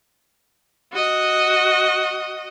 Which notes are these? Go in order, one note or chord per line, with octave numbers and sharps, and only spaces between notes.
F#4 D#5